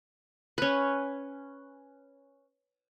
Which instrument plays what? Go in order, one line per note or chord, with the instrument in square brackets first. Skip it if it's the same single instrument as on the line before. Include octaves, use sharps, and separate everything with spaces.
[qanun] C#4 B4